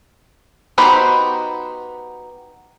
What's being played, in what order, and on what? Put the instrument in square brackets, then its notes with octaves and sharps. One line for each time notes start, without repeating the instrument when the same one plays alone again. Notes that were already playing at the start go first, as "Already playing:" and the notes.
[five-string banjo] B3 D#4 F#4 G4 C5